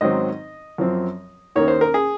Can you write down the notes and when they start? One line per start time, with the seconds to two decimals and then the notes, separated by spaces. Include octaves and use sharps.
0.01 G#2 D#3 F#3 C4 D#5
0.78 F#2 F3 C4
1.56 D#2 D#3 A#3 C#5
1.68 C5
1.81 A#4
1.94 G#4